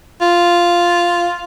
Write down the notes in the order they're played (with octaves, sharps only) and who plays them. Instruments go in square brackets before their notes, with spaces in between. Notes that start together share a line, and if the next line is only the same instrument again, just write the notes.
[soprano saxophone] F4